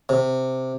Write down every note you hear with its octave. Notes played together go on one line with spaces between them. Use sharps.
C3